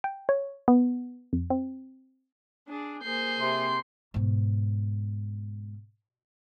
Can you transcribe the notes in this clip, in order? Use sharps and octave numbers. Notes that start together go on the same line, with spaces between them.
G5
C#5
B3
F2
C4
D4 G#4
A#3 G#4 C5 G6 C7
C3 C6
G#2 B2